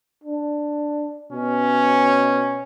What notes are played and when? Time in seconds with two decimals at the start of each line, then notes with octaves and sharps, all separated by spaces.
0.24 D4
1.33 B2 C#4